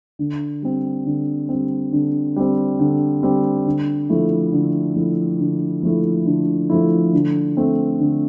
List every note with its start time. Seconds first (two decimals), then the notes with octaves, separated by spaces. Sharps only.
0.19 D3
0.62 G3 C4
1.06 D3
1.49 G3 C4
1.93 D3
2.36 G3 C4
2.79 D3
3.23 G3 C4
3.66 D3
4.10 F3 A3 E4
4.52 D3
4.96 F3 A3 E4
5.39 D3
5.83 F3 A3 E4
6.26 D3
6.70 F3 A3 E4
7.13 D3
7.57 A3 C4
8.00 D3